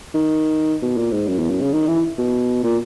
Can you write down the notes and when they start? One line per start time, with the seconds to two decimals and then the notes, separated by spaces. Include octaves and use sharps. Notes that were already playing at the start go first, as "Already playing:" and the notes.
0.14 D#3
0.82 B2
0.97 A#2
1.12 G#2
1.27 F#2
1.39 E2
1.50 F#2
1.62 C#3
1.73 D#3
1.88 E3
2.18 B2
2.64 A#2